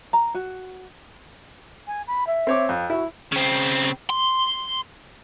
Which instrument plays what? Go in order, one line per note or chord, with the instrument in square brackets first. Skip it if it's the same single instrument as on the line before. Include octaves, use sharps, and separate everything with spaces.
[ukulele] A#5
F#4
[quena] G#5
B5
E5
[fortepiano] C4 C#5 D6
F2
[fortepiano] E4 [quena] F#4
[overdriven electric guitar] C#3 C4
C6